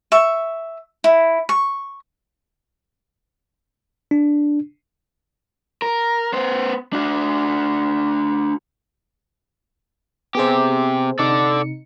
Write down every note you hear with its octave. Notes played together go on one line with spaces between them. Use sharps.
E5 C#6
E4
C#6
D4
A#4
B3 C5
D4 F#4
C3 B3 G4 G#4 C5
C3 D#4 A4 D5 C#7